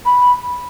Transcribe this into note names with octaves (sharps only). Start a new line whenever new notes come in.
B5